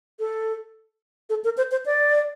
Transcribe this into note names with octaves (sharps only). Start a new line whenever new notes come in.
A4
A4
A#4
C5
C5
D5